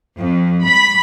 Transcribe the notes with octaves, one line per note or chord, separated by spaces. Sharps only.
F2
B5